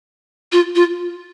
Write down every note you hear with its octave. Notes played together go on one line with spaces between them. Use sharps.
F4
F4